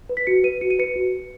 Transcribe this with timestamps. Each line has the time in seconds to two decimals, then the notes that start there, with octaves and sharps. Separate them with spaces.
0.09 B4
0.17 B6
0.27 F#4 C#7
0.44 B4 D#7
0.61 F#4 C#7
0.70 D#7
0.79 B4 C#7
0.96 F#4
1.13 B4